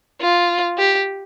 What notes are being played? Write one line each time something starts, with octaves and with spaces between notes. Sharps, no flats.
F4
G4